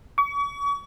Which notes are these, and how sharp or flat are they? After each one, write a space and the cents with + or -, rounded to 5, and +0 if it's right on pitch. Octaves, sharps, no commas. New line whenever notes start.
C#6 +40